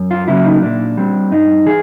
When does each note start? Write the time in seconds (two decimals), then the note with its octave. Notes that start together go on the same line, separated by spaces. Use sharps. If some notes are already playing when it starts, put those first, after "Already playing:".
Already playing: F#2
0.11 F4
0.28 C#3 F#3 A#3 E4
0.45 D#4
0.63 A#2 D4
0.97 G3 C4
1.31 G2 D#4
1.66 E3 G#4